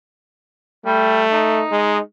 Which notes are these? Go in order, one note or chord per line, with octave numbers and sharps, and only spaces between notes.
G3 A3
D#4
G#3